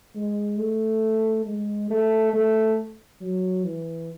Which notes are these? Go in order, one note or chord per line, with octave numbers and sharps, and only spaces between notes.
G#3
A3
G#3
A3
A3
F#3
E3